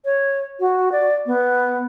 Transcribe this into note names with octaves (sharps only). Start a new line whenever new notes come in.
C#5
F#4
D5
B3